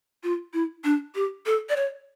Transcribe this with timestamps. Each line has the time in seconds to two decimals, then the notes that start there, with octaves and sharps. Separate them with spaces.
0.23 F4
0.53 E4
0.84 D4
1.15 G4
1.46 A4
1.69 D5
1.76 C#5